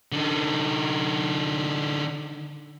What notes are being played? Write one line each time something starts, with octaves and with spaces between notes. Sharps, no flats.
D3 D#4